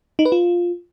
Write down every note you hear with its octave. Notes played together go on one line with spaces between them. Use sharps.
D#4
B4
F4